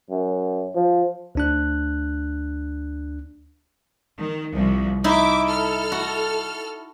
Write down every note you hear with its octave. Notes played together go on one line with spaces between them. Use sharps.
F#2
F3
D2 D4 F#6
D#3
C2 F3
D#4 E4 E5 D6
A4 F6
F#4